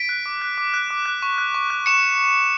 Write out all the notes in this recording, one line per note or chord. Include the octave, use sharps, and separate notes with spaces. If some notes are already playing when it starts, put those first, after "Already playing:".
Already playing: B6 D7
F#6
D6
F#6
D6
F#6
D6
F#6
C#6
F#6
C#6
F#6
C#6 C#7 E7